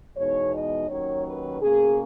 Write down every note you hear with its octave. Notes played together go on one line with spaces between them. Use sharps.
E2 B2 G#3 D#4 C#5
D#5
D#2 D#3 F#3 C#4 C#5
B4
B2 A#3 C#4 G#4